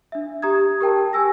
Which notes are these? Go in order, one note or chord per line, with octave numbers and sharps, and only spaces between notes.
D4 E5
G4 A#5 D#6 G#6
G4 A#4 G5 A5
G4 G#5 E6 A#6